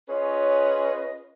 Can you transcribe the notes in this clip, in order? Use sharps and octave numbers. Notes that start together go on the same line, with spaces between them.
C#4 F4 G#4 B4 C#5 D#5